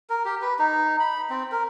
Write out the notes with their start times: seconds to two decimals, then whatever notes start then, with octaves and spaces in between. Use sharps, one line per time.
0.10 A#4
0.25 G4
0.42 B4
0.59 D#4
1.00 B5
1.30 C4
1.52 A#4